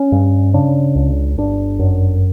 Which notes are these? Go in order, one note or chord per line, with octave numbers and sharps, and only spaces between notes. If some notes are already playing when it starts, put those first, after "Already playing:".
Already playing: C#4
G2
C#3 D4
C#2
G1 D4
F#2